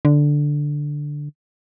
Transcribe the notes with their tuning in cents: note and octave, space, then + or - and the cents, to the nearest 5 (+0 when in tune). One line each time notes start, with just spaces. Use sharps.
D3 +0